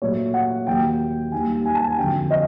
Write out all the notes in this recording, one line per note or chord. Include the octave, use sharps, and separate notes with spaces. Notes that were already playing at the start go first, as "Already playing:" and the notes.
A#2 F#3 A3 C#5
F#5
D#2 D#3 F#3 A#3 G5
D#2 D#3 G3 A#3 G#5
G#5
A5
G#5
F2 D3 F#3 G5
D#5